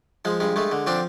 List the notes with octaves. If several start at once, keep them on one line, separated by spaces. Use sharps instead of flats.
F3 G#3
G2 G#3
G#3 A3
D3
F3 C4 D4